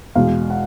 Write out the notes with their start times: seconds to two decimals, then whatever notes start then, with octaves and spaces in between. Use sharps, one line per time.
0.15 E2 B2 G#3 F5
0.50 F#5